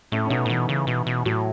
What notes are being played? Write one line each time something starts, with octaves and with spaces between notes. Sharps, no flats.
A2 A3 C#4
C#4
B2 B3 D#4
A2
B2 E3
C#3
B2
B2
A2 F#3